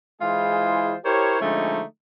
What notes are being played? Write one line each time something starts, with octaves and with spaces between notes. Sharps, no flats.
E3 G#3 E4 F4 G#4 C5
E4 G4 A#4 C5 C#5
D3 F3 G#3 A3 C#4 D#4